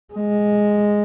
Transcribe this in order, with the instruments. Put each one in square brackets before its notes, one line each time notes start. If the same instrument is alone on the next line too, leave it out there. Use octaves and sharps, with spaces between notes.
[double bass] G#3